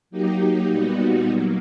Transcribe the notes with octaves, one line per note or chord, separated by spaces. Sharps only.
F#3 A#3 D#4 G4
A#2 G3 B3 D#4 F#4
F#3 A#3